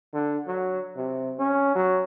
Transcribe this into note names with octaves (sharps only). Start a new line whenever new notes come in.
D3
F#3
C3
C#4
F#3